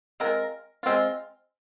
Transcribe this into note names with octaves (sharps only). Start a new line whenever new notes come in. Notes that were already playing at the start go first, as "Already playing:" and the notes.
G#3 C4 F4 A#4
G#3 C4 F4